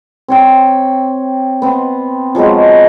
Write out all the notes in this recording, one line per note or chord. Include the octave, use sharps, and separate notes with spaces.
C4 C#5 G5
B3 C4
F3 F#3 G#3 B3